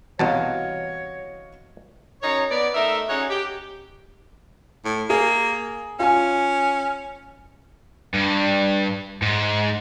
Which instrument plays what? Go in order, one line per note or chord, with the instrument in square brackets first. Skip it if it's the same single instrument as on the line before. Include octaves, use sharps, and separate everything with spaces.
[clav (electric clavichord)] C2 B2 A5 [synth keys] E3 [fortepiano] F#4 D#5 F5 [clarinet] C#5
[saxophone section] F#2 D#4 C#5
B3 D5
A3 D#4 A#4 E5
C#4 D#4 F#4 G#4 C#5
G4
[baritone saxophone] A2
[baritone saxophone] A#3 [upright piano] G#4
[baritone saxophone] C#4 [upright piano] F4 G#5
[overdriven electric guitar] G2
G#2